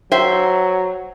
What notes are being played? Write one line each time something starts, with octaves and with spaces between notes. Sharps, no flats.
F#3 C5 E5 G5